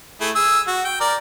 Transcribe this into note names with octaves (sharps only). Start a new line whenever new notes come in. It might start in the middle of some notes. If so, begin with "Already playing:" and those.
A3 E4 G#4
G#4 E6
F#4
G5
A#4 D5